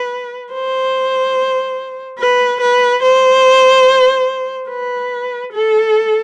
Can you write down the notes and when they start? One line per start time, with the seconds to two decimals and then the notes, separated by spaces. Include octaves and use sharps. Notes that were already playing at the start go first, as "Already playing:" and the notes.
Already playing: B4
0.53 C5
2.19 B4
2.61 B4
3.03 C5
4.69 B4
5.52 A4